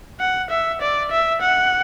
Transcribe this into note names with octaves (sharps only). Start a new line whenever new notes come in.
F#5
E5
D5
E5
F#5